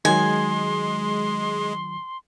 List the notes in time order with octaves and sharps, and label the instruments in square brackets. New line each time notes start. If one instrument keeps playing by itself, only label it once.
[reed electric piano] D#3 F#3 [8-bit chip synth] G#3 [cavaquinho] G#5 [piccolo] C6